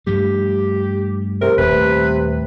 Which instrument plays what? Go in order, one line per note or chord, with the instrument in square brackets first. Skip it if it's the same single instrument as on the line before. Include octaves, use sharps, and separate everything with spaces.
[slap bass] G2 F3 A3 [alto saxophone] G4
[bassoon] C3 [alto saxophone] A#4
[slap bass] D#1 A3 [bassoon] C3 [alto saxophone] B4